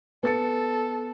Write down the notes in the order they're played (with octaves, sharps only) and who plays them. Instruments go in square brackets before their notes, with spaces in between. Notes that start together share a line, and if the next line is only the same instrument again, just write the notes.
[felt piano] B3 A6 C#7 [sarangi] A4